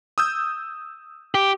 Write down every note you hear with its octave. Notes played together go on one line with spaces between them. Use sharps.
D#6 E6 G6
G4